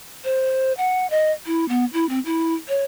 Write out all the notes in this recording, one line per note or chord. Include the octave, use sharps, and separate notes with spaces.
C5
F#5
D#5
E4
B3
E4
C4
E4
C#5